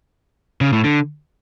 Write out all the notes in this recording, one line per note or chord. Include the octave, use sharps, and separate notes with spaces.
C#3
A2
D3